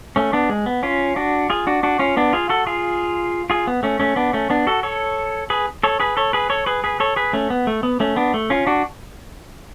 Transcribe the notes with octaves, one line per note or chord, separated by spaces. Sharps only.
A3 C#4
B3 D4
G#3
B3
C#4 F4
D4 F#4
F4 G#4
D4 F#4
D4 F#4
C#4 F4
B3 D4
F4 G#4
F#4 A4
F4 G#4
F4 G#4
B3
A3 C#4
A3 C#4
B3 D4
A3 C#4
B3 D4
F#4 A4
A4 C#5
G#4 B4
A4 C#5
G#4 B4
A4 C#5
G#4 B4
A4 C#5
G#4 B4
G#4 B4
A4 C#5
G#4 B4
A3 C#4
B3
A3
B3
A3 C#4
B3 D4
A3
C#4 F4
D4 F#4